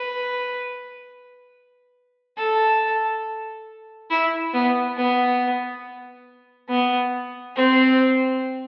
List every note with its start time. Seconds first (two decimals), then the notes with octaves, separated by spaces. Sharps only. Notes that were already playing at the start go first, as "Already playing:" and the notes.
Already playing: B4
2.37 A4
4.10 E4
4.54 B3
4.97 B3
6.69 B3
7.56 C4